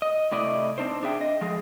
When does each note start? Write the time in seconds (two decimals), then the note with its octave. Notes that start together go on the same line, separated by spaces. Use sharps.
0.02 D#5
0.32 A2 C3 E4 D5 D#5
0.78 C4 D4 D#4 C5
1.03 D4 G#4 E5 G5
1.21 D#5
1.41 F3 G#3 G#4